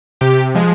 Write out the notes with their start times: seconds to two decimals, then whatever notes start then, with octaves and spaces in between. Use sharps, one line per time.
0.21 C3 G4
0.55 F3 G#3